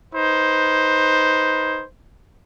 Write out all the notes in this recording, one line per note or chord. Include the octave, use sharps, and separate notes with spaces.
D#4 B4 C5